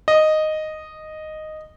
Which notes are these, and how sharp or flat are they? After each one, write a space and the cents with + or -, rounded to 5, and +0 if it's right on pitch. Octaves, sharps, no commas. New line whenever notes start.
D#5 -5